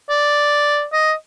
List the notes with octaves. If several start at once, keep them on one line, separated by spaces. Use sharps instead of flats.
D5
D#5